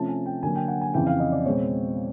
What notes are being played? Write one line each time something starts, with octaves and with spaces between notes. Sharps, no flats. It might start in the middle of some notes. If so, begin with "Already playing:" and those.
Already playing: C3 F3 A3 C#4 A5
G#5
G5
D3 F#3 A#3 G#5
G5
F#5
G#5
F2 C#3 E3 G5
F5
D#5
D5
B2 G#3 C4 C#5